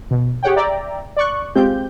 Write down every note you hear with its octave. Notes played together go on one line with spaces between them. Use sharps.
B2
G4 G#4 C#5 F#5 G5
D5 E5 G5 A#5
D5 C#6 F#6
G#3 C4 F4 G4 G6